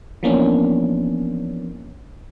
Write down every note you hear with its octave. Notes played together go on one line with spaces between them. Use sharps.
E3 F3 A#3 B3 C#4 D4